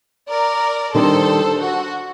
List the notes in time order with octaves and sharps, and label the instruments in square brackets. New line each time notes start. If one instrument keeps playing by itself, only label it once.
[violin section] A#4 D5
[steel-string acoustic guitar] D#3 G3 D4 [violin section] A4 C5
[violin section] F#4